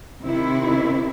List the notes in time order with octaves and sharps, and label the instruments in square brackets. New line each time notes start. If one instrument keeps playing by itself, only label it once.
[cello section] C3 D#3 E4